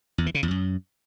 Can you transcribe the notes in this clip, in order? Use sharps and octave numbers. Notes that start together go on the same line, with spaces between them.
E2
E3
C#3
E2
F#2